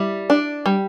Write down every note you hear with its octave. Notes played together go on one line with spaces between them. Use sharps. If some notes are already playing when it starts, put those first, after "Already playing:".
Already playing: G3 E4
D4
G3